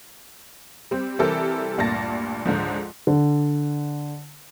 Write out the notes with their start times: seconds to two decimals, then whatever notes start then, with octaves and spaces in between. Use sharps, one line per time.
0.91 G3 C4
1.19 C3 E3 G3 C4 A4 A#4
1.78 D2 G2 A#2 A5 A6 A#6
2.45 C#2 G#2 D3 F3
3.07 D3